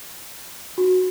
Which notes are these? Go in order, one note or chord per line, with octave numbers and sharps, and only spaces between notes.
F#4